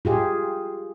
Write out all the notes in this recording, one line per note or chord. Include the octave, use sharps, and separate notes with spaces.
F4 G4 G#4